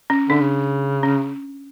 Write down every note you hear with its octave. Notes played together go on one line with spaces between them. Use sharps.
C#4
D3 D4
C#3
C#4